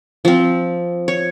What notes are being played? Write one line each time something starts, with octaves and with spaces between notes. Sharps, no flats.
F3 C4
C#5